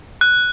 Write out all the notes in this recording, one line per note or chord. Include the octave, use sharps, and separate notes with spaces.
F#6